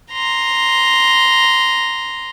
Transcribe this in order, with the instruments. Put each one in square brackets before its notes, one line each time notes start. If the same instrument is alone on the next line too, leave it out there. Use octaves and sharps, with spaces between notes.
[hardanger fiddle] A#5 C6